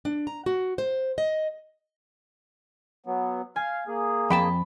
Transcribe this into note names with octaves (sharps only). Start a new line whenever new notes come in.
D4
A#5
F#4
C5
D#5
F#3 B3
F5 G#5
A#3 G#4
F2 G5 A5 B5